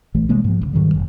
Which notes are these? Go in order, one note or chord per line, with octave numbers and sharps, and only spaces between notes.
A#1 E3 A3
C3 G#3 A#3
G#2 F3
A1 C#3
G#2 D#3 F#3 G3
F1